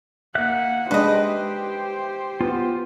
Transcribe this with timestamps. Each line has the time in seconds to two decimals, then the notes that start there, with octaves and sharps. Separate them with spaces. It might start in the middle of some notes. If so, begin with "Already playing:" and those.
0.35 A#3 E5 F#5 F#6
0.91 G#3 D4 G4 B4 C5 D#5
2.41 B3 F4